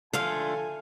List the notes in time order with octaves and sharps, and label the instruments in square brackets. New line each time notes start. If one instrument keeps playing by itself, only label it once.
[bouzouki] D3 F3 A3 [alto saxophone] A4 [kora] F5 [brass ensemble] G#5